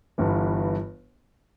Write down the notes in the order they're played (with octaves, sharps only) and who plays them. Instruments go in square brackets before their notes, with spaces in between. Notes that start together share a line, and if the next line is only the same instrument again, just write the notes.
[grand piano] G1 G2 E3